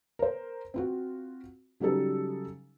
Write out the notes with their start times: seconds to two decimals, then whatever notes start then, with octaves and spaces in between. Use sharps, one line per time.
0.19 A#4 C5
0.74 C4 F4 F#4
1.80 C#3 F#3 G3 D#4 A4